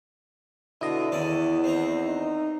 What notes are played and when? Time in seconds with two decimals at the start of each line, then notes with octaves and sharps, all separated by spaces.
0.81 B2 D3 E4 D#5
1.12 E2 D#3 C#4 D5
1.64 C4 A#5
2.06 D#4